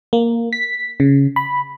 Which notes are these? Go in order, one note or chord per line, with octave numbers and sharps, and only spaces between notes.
A#3
B6
C#3
B5